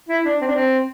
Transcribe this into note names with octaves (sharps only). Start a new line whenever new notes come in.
E4
D4
C4
D4
C4